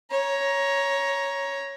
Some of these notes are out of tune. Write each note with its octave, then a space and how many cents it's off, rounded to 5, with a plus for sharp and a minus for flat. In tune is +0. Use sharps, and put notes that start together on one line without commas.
C#5 +0 A#5 +20